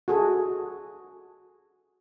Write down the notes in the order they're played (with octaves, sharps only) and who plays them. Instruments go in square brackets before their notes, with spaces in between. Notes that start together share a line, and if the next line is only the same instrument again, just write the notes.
[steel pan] F#4 G#4 A4